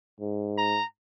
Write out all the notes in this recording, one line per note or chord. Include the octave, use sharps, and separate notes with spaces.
G#2
A#5